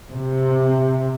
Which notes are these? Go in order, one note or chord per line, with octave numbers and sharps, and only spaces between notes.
C3